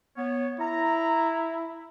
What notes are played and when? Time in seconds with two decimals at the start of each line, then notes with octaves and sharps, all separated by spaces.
0.16 B3 C#5
0.60 E4 A#5